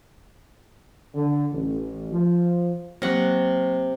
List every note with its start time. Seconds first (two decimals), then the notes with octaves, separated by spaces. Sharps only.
1.15 D3
1.51 A1
2.12 F3
3.02 C3 F#3 A#3 F#5